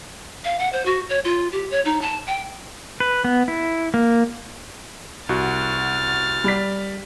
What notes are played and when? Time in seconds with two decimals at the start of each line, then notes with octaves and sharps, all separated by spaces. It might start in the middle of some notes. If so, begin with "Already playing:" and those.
0.44 F5
0.59 F#5
0.72 C5
0.85 F#4
1.09 C#5
1.24 F4
1.52 G4
1.70 C#5
1.85 D#4
2.01 A5
2.26 G5
3.00 B4
3.24 B3
3.48 E4
3.94 A#3
5.29 C2 F#4 F6 A6
6.44 G3 D5 B6